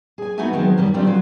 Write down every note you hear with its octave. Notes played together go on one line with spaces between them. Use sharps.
G#4 G#5
A3 B3 D#4 F#4 E5 G#5
D#3 F3 F#3 G#3 B3 C4
F#2 D#3 G3
D#3 G3 C4 D4 D#4 F4
C#3 F#3 F4